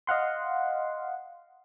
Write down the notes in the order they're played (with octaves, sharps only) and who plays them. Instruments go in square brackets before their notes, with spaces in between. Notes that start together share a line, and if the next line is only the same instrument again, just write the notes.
[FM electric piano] D#5 F5 F#5 C6